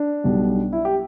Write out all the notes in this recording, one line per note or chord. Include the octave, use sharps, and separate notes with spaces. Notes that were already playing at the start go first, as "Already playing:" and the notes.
Already playing: D4
B1 B2 G3
E4
G4